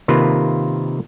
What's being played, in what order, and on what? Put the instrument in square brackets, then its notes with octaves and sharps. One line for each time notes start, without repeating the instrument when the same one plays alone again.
[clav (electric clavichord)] C3 D#3 A#3 F4 B4